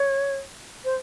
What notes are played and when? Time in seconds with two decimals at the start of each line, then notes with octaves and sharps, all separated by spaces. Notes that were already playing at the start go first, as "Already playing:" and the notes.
Already playing: C#5
0.85 C5